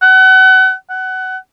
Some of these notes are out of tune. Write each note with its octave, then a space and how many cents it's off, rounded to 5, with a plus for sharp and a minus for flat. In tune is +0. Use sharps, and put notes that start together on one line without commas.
F#5 +30
F#5 +20